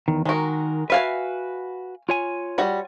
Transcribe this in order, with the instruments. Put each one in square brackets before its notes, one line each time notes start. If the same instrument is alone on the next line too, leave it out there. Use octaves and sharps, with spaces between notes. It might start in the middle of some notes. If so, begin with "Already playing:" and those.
[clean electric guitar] E2 D#3
[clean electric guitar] D#3 A#4 [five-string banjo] G#3 F#4
[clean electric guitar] F#4 B4 [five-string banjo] E5 F5 G#5
[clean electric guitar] F4 C#5 G#5
[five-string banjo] G3 F#4